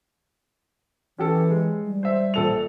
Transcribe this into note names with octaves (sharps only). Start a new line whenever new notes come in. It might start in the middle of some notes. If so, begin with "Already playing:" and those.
E3 C#4 G4 A4
G#3
G3
C5 E5
A#1 A4 F7